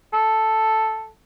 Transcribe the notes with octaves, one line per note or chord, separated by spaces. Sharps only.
A4